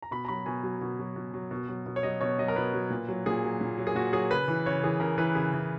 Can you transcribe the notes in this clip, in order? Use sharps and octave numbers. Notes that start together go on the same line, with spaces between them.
A#5
B2 B5
A#5
F#3 B5
B2 G#5
F#3
B2
F#3
B2
F#3
B2
F#3
B2
C#5
F#3 D#5
B2 C#5
F#3 D#5
A#4
B2 B4
F#3
A#2
F#3
A#2 G#4
F#3
A#2
F#3
G#4
A#2 F#4
F#3 G#4
C#3 B4
E3
C#3 C#5
E3 G#4
C#3 A#4
E3 B4
C#3 G#4
E3